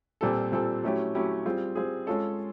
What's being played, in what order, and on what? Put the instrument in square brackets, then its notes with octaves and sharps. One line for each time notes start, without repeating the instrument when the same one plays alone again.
[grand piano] A#2 G3 C4 F4 A4
A#2 G3 C4 F4 A4
F#3 A3 C#4 E4 G4
F#3 A3 C#4 E4 G4
G3 C4 F4 G#4
G3 C4 F4 G#4
G#3 C#4 F4 A4 C#5